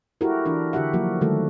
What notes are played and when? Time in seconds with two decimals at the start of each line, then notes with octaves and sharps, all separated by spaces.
0.21 E4 F#4 G4 A4 A#4
0.45 E3 D4 A#4
0.73 D3 F#4 G4 E5 F#5
0.93 F3 F#3 A#3 F#4 A#4
1.21 D3 D#3 G3 A3 F#4 A4